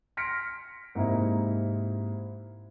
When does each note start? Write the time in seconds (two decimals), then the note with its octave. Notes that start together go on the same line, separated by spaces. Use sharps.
0.17 C6 F6 A#6 B6 C#7 D7
0.95 G#2 C3 A#3 C4 D#4 E4